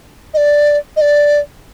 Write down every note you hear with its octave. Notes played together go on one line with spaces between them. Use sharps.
D#5
D5
D#5
D5